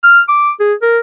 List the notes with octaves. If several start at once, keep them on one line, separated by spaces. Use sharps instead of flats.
F6
D6
G#4
A#4